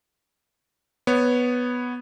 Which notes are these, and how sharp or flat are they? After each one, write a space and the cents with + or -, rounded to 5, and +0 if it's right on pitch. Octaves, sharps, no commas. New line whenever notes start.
B3 +0 C#5 +0